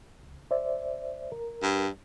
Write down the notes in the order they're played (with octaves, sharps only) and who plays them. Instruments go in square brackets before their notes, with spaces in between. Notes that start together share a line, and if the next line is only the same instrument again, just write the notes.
[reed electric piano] C#2
C5 D5 E5
A#4
[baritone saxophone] G2